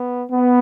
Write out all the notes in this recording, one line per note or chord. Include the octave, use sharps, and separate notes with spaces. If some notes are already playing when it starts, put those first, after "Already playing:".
Already playing: B3
B3